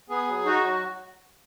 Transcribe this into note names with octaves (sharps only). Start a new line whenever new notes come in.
B3 G#4
F#3
D#4 F#4
F#3